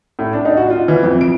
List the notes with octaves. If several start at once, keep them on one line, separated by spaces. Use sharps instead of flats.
A2
D4
D#4
F#4
F4
E3
F2
D7